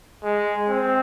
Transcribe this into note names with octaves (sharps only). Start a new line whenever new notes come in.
G#3
C4